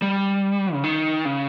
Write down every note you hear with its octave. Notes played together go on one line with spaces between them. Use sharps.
G3
C#3
D#3
C#3